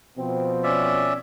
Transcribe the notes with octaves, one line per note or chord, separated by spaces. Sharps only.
B2 F3 C4
C#4 D5 E5